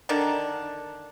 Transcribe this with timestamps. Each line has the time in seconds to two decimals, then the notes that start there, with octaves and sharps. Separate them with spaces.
0.09 D3 D#3 D4 A#5